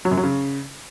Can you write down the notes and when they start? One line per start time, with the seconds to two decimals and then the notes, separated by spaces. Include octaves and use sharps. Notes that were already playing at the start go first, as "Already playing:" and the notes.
0.05 F#3
0.11 F#2
0.17 F#3
0.23 C#3